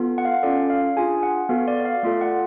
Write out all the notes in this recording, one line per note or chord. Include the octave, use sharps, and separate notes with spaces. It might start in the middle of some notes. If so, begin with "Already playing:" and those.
Already playing: B3 F4 A4
F#5
F5
C#4 F4 A4 D5
F5
D4 F4 G#4 G#5
F#5
B3 F#4 A4 F5
D5
D5
F5
A3 F4 A4 D5
F#5